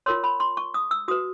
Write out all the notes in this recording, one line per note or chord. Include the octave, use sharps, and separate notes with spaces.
F4 A#4 C#5 C6
B5
C6
C#6
D#6
E6
F#4 B4 D#6